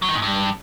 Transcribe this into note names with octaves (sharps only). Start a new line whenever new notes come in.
F#3
D#3
G#2
G2